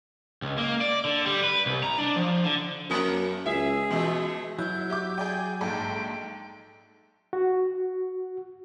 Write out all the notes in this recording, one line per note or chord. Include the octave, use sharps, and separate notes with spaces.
C#2
A#3
D5
D3
G3
B4
C2
A#5
D4
F3
D3
F#2 A3 A#3 A#4
C#2 G#4 E5
B2 E3 G#3 A3
F#3 E4 G6
G4 E5 D6
G#4 D5 G5
A#1 G#2 A4 G5
F#4